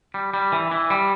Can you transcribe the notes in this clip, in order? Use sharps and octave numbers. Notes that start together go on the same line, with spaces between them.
G3
G3
E3
E3
G3